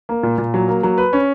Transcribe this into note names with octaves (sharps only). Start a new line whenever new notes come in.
A#3
A#2
A#2
F#3
A#3
F#3
B4
C#4